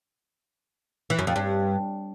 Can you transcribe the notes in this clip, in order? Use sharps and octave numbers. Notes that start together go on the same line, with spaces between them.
E3
F#2
F2
G2